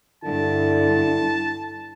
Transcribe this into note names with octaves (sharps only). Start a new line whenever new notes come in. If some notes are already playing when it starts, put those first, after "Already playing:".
G2 D3 E4 A5